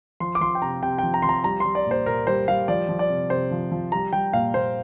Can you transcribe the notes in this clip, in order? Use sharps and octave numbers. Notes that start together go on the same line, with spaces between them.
F3 C6
D6
F3 C6
G5
C3 A#5
C3 G5
F3 G5
A#5
F3 C6
A#5
G3 A#5
G3 C6
D5
A#2 C5
A#2 A#4
G3 C5
G3 F5
F3 D5
F3
D5
C3
C3 C5
F3
F3
G3 A#5
G3 G5
A#2 F5
A#2 C5